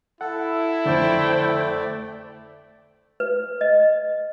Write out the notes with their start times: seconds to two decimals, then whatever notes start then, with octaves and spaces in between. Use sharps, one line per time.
0.21 E4 A4 F#5
0.86 F2 D3 A3 C5 D5 G5
3.20 B4
3.61 D#5